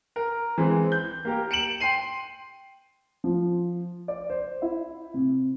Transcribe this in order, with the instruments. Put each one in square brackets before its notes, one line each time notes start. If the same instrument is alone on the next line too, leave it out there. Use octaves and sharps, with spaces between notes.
[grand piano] A#4
E3 G#3 C4
G6
A#3 G4 A#4
C#7 D7 E7 F#7
G5 C6 C7 D#7
F3
D5
C5
E4
C3